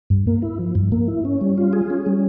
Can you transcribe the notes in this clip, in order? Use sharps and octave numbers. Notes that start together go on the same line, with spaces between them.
G2
A#3
E4
F3
G2
A#3
E4
C#4
G3
F4
G#4
C#4
G3